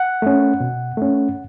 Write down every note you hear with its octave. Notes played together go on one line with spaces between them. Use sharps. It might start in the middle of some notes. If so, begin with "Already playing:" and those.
Already playing: F#5
A3 C#4
B2
A3 C#4